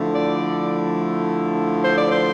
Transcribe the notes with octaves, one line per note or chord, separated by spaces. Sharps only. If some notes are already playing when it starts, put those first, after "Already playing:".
Already playing: D3 F3 A3 E4
D5
C5
D5
C5